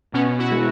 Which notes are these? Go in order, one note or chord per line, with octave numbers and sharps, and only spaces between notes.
B2 B3 C#4
E4 F#4
G#3